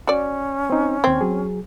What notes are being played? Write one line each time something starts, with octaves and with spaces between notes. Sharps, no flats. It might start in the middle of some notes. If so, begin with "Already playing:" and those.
C#4 F#4 D5
C4 D#4
D#2 C4 G#6
F#3 G#4